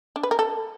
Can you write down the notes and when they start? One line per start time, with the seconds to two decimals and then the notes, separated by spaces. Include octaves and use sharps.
0.16 D4
0.23 B4
0.31 A#4
0.39 A4